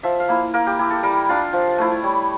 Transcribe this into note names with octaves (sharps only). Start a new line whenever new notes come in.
F3 E5
F5
A#3 E4
A#3 A#4
G4
E4 G4
A4
G3 A#4
D4 F4
F3
A3 E4
G3 C#5